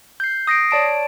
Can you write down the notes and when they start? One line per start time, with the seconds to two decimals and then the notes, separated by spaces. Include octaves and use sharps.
0.20 G6 C7
0.47 D#6 A#6 C7 D7
0.71 C#5 D5 A5 D7